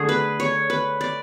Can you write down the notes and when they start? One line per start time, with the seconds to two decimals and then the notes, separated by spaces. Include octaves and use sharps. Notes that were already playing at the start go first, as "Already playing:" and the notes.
Already playing: D3 A3 G#4
0.09 B4
0.40 C#5
0.70 B4
1.01 D5